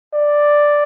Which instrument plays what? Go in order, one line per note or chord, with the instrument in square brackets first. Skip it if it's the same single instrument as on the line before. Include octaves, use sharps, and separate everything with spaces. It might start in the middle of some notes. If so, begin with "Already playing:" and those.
[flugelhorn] D5